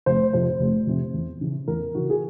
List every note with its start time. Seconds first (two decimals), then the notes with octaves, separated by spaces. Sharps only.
0.06 F1 C5
0.33 F2 C3 C5
0.60 F1
0.87 F2 C3
1.14 E2
1.41 C#3 E3
1.68 E2 A#4
1.94 C#3 E3 F#4
2.10 G#4